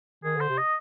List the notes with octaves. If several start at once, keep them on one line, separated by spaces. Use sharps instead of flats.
D#3 G#4
D3
C5
C3
D#5